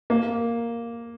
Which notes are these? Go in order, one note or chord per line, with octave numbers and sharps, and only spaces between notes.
A#3